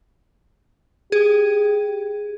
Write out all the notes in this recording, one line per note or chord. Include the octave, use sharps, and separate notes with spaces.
G4 G#4